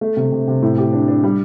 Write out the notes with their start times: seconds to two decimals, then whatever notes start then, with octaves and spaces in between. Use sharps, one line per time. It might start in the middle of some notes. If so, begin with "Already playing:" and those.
0.01 A3
0.17 C3
0.32 C3
0.48 C3
0.62 A2
0.78 G4
0.92 D4
1.08 D4
1.23 G3